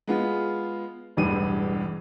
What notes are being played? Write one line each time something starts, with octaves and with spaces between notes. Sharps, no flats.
G#3 B3 F4
E1 A1 E2 G2 D#7